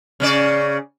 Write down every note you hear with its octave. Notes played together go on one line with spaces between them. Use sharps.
C#3 C#4 D5